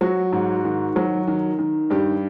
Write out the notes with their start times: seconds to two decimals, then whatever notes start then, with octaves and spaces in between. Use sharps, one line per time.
0.01 F#3 F#4
0.32 G#2
0.65 D#3
0.96 F#3
1.27 D#3
1.59 D#3
1.90 G2 G4